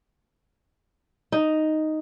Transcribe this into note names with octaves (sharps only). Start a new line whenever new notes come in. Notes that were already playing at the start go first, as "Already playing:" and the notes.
D#4